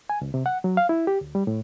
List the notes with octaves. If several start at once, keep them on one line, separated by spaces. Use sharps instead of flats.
G#5
C#2
C3
F#5
F#3
F5
E4
G4
D2
G3
A2